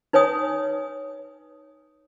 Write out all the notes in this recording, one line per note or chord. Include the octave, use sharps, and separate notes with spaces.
D#4 B4 C#5 G#5 D#6